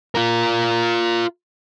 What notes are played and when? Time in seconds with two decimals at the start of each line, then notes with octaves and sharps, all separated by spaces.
0.15 F4 A#4